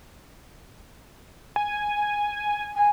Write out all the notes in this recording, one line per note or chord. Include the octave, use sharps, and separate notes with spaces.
G#5
G#5